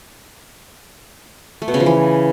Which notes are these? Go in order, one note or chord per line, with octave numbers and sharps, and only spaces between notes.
A3
B2
C#3
F3
E3